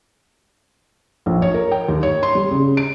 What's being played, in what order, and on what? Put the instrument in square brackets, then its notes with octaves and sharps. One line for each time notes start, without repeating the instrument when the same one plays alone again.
[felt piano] A#1
C#5
A#4
G5
D#2
C#5
C6
G3
C#3
D7